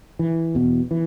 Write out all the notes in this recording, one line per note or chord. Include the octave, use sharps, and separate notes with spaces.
E3
E2 B2
E3